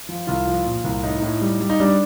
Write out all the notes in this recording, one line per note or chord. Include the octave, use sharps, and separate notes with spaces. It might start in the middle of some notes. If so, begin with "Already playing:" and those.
F3
C2 F4
F3
A#2
C2
A2 D#4
A2
G3
G3
D#4
G3 D4